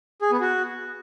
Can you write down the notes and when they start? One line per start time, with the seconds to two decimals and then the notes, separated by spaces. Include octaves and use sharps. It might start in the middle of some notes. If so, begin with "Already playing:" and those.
0.22 G#4
0.31 B3
0.41 F#4